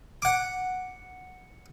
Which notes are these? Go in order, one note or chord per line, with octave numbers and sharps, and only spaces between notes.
F#5 D6